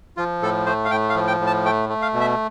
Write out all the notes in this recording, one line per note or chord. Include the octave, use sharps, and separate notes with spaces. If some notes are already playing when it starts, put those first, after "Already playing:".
F3 F4
A2 A4
A3 C5
F5
A2 G5
F5
F3
G5
A2
A5
A3 G5
A3
F5
B2
E5